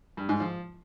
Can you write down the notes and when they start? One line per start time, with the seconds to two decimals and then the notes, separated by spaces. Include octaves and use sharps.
0.17 G2
0.29 G#2
0.40 F3